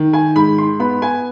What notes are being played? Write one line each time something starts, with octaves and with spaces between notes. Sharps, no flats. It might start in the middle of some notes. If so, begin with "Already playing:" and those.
Already playing: D#3
G#5
G#2 B5
C6
B3 B5
G#5